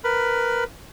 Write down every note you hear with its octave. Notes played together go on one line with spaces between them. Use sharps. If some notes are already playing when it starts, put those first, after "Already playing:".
A#4 B4 B5